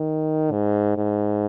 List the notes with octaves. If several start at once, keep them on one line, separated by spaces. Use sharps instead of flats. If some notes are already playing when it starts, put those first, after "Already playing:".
Already playing: D#3
G#2
G#2